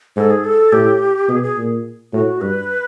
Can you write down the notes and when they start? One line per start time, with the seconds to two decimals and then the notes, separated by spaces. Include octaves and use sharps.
0.16 G#2 A4
0.31 G#4
0.45 A4
0.72 A2 G4
1.28 B2 G#4
1.43 G#4
1.58 A#2
2.13 A2 F#4
2.41 G2 B4